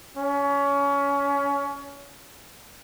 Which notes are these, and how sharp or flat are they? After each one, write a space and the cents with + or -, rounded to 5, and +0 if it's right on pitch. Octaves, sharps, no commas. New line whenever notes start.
C#4 +25